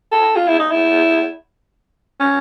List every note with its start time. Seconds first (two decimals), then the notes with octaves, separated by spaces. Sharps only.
0.12 A4
0.36 F4
0.48 E4
0.59 D#4
0.71 E4
2.20 C#4